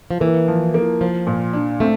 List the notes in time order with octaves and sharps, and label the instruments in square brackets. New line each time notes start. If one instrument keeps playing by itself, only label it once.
[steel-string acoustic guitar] F3
[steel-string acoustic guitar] E3 [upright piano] A#3
[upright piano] F3
A#3
[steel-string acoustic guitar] F3 [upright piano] F4
[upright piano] A#2
D4
[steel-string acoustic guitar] A3 [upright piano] C4